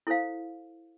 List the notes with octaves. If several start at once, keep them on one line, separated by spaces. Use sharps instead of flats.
E4 A4 C5 F5